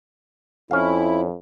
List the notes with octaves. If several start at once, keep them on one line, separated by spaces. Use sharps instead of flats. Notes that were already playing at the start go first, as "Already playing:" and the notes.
F2 C#4 E4 F5